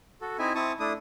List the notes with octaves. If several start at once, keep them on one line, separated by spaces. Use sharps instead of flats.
F#4 A4
C4 D#4 E4 E5 G#5
C4 E4 A5 C#6 D#6
A3 D4 E4 D#6